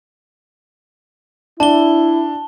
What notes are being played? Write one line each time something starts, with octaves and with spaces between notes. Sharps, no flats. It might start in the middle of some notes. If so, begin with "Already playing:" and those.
D4 E4 A5 G7